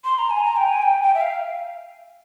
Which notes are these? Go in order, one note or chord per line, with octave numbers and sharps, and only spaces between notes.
C6
A#5
G#5
A#5
G5
G#5
G5
G5
E5
F5